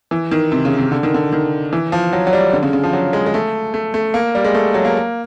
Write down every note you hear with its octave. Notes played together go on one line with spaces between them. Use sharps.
E3
D#3
C3
C#3
C3
D3
D#3
D3
D#3
E3
F3
F#3
F#3
G3
D3
C#3
C#3
F3
F#3
G#3
G#3
A3
A3
A3
A#3
G3
G#3
A3
F#3
A#3